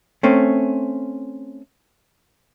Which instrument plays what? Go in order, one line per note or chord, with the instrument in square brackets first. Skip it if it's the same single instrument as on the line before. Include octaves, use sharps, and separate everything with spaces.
[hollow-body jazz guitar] A3 C4 C#4